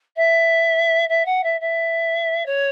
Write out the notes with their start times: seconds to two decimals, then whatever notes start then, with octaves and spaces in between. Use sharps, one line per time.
0.16 E5
1.09 E5
1.25 F#5
1.43 E5
1.60 E5
2.46 C#5